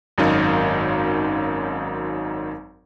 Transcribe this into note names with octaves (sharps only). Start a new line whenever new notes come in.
G#1 F#2 F#3 D#4 A#4 F5